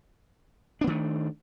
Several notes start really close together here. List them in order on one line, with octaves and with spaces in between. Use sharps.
D4 B3 D#3 A3